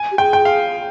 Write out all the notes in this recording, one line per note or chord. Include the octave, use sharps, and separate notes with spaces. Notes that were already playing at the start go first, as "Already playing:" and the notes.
Already playing: G#5
G4
G#4 G5
G5
F5